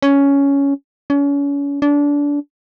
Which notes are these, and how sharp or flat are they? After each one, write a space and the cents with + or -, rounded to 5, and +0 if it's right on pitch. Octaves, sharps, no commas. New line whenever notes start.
C#4 +10
C#4 +35
D4 -25